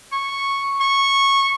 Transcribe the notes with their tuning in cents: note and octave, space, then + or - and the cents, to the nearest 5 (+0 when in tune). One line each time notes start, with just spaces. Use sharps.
C#6 -5
C#6 -15